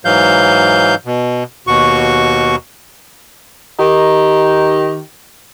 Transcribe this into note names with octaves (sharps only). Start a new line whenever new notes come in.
G#2 E3 F#3 F5 G6
B2
D#2 B2 F#4 C#6
D#3 D#4 G4